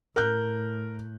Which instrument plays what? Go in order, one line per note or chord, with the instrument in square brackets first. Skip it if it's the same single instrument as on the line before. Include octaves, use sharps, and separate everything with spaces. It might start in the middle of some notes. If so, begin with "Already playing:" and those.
[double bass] A2 [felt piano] A#4 F#6 G6